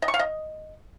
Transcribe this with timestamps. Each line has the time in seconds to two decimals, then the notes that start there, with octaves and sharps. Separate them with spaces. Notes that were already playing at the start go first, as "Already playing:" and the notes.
0.02 D#5
0.08 C#6
0.14 F5
0.19 D#5